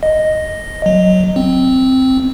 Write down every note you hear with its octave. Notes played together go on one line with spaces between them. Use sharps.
D#5
F#3
C4